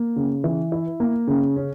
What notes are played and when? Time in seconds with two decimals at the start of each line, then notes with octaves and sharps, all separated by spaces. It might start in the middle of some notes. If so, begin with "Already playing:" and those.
Already playing: A#3
0.16 C#3
0.44 E3
0.72 E4
1.00 A#3
1.27 C#3
1.56 C#4